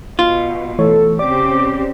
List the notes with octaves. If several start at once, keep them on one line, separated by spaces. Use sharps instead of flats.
B2 F4
E3 A3 A4 C#5
C#3 C4 G4 D5 D6